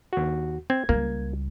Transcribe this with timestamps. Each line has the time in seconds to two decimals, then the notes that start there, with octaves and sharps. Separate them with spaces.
0.13 D#2 F#4
0.70 C4 G#6
0.89 C#2 G3 A#3